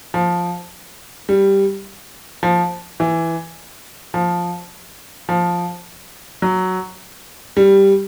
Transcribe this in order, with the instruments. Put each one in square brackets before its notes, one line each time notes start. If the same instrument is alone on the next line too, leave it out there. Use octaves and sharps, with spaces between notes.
[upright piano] F3
G3
F3
E3
F3
F3
F#3
G3